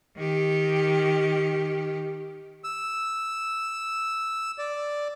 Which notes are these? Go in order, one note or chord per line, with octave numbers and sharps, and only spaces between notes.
D#3 G4
E6
D5